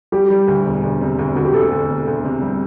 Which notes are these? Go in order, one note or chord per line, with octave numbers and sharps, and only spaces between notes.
G3 G4
G3
D2
E1
D2
C3
D2
D2 F#4
G4
D2 A4
D2
E1
D2
C3
G3